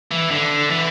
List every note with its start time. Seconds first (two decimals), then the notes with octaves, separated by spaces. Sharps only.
0.11 E3
0.31 D3
0.70 E3